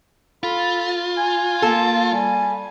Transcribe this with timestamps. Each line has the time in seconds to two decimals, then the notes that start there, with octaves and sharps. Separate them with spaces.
0.43 F4 A4 B5
1.18 G#5
1.62 A#3 A4
2.11 G3 G#5